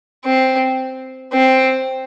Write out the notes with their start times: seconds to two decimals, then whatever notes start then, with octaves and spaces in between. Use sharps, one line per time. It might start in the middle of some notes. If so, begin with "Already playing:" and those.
0.25 C4
1.33 C4